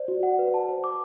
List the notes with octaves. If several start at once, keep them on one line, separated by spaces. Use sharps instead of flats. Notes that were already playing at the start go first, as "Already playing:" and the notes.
Already playing: C5 D5
F#4
F#5
B4
A5
C5
D6